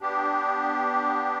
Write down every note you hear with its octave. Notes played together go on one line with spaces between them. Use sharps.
B3 D4 G4